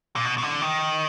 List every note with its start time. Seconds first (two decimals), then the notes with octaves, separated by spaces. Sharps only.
0.16 A#2
0.25 B2
0.38 B2
0.43 D3
0.61 D#3